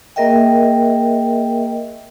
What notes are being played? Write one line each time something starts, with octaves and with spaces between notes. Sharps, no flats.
A#3 G#4 A#4 D#5 E5 G5